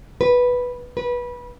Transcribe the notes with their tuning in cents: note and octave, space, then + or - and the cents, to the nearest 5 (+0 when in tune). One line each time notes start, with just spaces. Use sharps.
B4 -5
B4 -20